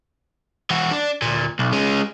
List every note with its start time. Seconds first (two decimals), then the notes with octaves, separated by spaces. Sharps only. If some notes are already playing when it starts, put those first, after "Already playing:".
0.70 E3 F#4
0.91 D4
1.22 D2 A#2
1.59 B1
1.72 G#3 C#4